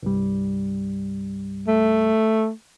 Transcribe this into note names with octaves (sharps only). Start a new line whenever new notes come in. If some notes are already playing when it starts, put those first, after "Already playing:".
C2 G2 G3
A3